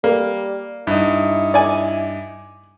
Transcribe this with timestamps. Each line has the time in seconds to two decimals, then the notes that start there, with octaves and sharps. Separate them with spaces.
0.04 G3 A#3
0.87 G2 D#4 E4
1.54 D5 G#5